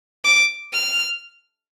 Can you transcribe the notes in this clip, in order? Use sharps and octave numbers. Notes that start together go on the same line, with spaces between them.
D6
F6